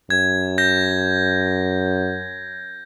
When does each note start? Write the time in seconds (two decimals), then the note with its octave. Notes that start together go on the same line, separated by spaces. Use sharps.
0.10 F#2 G#6
0.58 G6 A#6